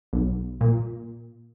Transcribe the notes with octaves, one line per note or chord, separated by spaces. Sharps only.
B1
A#2